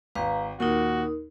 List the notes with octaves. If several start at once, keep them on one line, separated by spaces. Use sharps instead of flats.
G#1 B4 F5 A#5
D#2 A#2 D#4 F#4 A#4